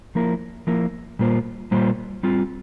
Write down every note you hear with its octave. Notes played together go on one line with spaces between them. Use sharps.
F3 A#3 E4 A#4
F3 A#3 E4 A#4
A#2 G3 A#3 F4 C5
A#2 G3 A#3 F4 C5
G3 C4 F4